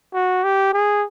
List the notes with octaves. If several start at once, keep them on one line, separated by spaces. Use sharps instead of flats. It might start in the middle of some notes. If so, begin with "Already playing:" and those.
F#4
G4
G#4